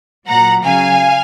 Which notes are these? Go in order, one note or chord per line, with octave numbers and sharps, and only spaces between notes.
A#2 F#3 F#5 A#5
C#3 F#3 F5 G#5